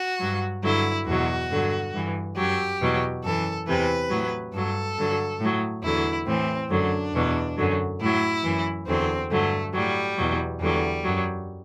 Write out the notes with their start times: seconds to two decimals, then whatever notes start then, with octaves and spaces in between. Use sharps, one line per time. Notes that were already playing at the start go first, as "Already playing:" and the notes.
Already playing: F#4
0.19 G2 F#3
0.63 G2 D3 F#3 E4
1.06 E2 B2 F#3 F#4
1.49 G2 D3 F#3
1.93 G2 E3
2.36 F#2 F#3 G4
2.80 E2 B2 F#3
3.23 F#2 E3 A4
3.66 E2 C3 E3 B4
4.09 A2 F#3
4.52 G2 F#3 A4
4.96 G2 D3 F#3
5.40 A2 F#3
5.83 E2 D3 F#3 E4
6.26 A2 E3 C4
6.69 F#2 D3 F#3 D4
7.13 E2 B2 F#3
7.57 F#2 D3 F#3
8.00 A2 F#3 E4
8.43 F#2 E3
8.86 E2 D3 F#3 C4
9.30 G2 D3 F#3 A3
9.73 A2 F#3 G3
10.17 E2 B2 F#3
10.60 E2 D3 F#3 G3
11.03 F#2 F#3